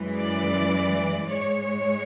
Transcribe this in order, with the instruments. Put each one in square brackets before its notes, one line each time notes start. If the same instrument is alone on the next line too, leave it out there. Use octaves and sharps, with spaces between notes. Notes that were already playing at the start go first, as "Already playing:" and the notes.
Already playing: [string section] F#2 E3 G#3
D5
G#2 G#3 C#5
C#5